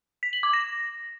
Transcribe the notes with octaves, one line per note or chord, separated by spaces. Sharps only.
B6
F#7
D6
A#6